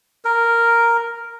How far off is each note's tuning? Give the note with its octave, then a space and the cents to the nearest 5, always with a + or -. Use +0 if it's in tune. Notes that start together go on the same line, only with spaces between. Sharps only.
A#4 -5